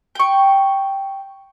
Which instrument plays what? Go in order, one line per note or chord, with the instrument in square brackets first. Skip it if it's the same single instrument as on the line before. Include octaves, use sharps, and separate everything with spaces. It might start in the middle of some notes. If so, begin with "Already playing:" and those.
[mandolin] G5 C#6